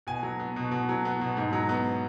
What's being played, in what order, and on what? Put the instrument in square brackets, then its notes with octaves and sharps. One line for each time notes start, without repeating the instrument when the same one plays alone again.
[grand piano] B2 G#5
F#3
B3
B2
B2
F#3
B3
B2
G#2
F#3
B3